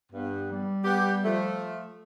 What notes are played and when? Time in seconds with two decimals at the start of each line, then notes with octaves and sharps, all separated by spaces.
0.12 G2 B3
0.52 G3
0.84 B3 G4
1.24 F3 A3